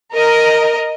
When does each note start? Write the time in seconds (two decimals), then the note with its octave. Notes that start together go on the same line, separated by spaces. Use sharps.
0.13 A#4 D#5